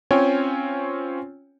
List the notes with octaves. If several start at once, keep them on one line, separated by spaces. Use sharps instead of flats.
C4 C#4 F4 C#5 G5 G#5